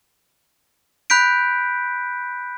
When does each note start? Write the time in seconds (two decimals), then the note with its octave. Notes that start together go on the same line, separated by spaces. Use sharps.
1.10 B5 F#6 G6 B6 D7